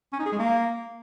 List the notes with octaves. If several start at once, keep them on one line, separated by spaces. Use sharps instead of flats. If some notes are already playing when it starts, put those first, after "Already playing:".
C#4
D#4
G#4
G#3
A#3